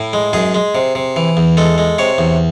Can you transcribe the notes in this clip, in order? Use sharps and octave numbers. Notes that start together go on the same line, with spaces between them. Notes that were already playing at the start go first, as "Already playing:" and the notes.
Already playing: A2 E4
G#3
F#2 G#4
G#3
C3
C3
E3
E2
G#3 A4
G#3
C3 C#5
E2